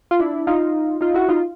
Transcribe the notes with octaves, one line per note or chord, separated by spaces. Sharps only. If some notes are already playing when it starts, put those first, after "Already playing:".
F4
D4 E4
D#4 F4
D#4 F4
E4 F#4
D#4 F4